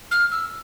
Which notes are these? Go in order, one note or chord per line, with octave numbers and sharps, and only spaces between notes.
F6
E6